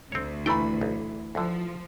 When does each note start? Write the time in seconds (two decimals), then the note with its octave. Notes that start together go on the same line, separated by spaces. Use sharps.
0.12 D2 C4 C#5
0.46 A#2 E3 A3 G5 B5
0.81 B1
1.35 D2 D3 F3